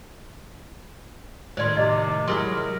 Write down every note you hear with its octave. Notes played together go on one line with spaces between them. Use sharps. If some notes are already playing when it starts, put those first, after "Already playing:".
A2 D#3 C5 D5 C6
C3 D#5
F#3 G#3 E4 A#4 C6 D6 D#6